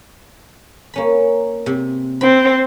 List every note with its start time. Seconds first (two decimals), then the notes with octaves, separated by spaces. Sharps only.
0.94 A#3 C#4 B5
1.66 C3
2.21 C4 B5